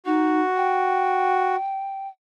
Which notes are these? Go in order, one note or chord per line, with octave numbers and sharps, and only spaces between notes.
D#4 F#4
G5